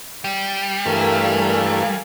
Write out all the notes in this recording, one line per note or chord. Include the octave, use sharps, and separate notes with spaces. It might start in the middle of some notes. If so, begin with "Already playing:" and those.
G3
G2 E3 A3 A#4 F5 G#5